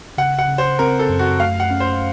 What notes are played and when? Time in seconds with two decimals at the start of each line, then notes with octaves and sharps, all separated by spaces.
0.18 C#3 F#5
0.39 F#5
0.48 C#3
0.58 C5
0.79 C4 A#4
0.99 A4
1.09 F#2
1.19 F#4
1.40 A3 F5
1.60 F#5
1.71 C#4
1.80 C5